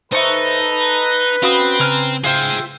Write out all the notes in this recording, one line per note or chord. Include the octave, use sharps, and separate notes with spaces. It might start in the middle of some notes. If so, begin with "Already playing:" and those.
D#4 A4 B4 C5 E5 C#6
A#5
C4 C#4 F#4 F5 B5 D#6
C#3 G#5 A#5 F6
F4 G#4 C5 E5 G5